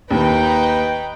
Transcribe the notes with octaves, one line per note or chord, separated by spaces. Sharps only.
D#2 D#4 B4 G5